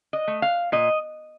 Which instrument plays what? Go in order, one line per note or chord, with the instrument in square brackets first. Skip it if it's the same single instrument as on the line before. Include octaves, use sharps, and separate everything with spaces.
[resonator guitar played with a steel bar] D#5
A3
F5
A#2 D#5